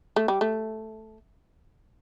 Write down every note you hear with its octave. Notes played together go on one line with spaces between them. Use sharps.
A3
G3
A3